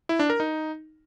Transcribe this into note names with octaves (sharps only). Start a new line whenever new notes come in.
E4
D4
A#4
D#4